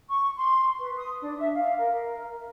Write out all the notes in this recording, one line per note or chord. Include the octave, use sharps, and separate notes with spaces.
C#6
C6
B4
D#6
D4
E5
F5
A#4